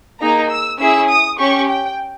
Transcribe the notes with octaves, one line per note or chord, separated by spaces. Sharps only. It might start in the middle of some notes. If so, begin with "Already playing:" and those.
A#3 D#4 G#4 A#5
E6
C#4 E4 G#4 E6
D#6
C#4 G4 C#6
G5